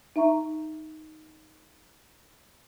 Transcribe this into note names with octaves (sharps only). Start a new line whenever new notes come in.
D#4 E5 A#5 C#6